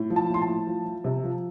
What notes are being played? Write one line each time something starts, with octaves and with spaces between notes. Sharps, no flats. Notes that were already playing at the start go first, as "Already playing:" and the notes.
Already playing: A2
F3
A5
A2 C6
A5
A2
F3
F3
C3
F3